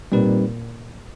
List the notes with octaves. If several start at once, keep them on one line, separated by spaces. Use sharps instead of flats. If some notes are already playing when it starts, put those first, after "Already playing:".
A#2 G3 C4 D#4 G4 B4